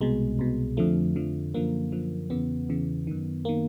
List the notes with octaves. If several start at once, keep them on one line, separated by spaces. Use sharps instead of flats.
C2 B2 G#3
C2 B2
F2 D3 F3 A3
F2 D3 F3
F#2 D3 F3 A#3
F#2 D3 F3
E2 C#3 E3 B3
E2 C#3 E3
F#2 D#3
D#3 A#3